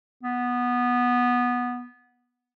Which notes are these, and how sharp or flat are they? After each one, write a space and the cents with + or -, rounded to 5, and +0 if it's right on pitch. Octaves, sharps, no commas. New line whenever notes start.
B3 -10